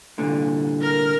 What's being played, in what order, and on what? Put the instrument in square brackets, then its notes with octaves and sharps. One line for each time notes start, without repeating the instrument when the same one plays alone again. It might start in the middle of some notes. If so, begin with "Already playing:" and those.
[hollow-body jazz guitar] C2 A#2 D3
[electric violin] A#4 F6